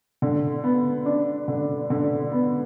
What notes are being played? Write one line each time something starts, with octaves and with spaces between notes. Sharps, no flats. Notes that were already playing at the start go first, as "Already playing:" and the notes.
D3
B3
D4
D3
D3
B3